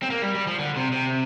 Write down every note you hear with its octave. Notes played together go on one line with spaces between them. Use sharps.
C4
A#3
G3
G3
F3
D3
C3
C3